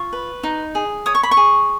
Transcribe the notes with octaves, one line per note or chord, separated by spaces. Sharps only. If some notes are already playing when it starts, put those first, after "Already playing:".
Already playing: F4 C#6
B4
D#4
G#4
C#5 D#6
C#6
B5
C#6
G#4